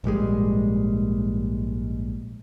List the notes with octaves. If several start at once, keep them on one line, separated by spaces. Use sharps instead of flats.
A#1 G#2 G3 G#3